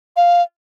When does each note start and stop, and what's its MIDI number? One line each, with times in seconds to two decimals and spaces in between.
0.16 0.42 77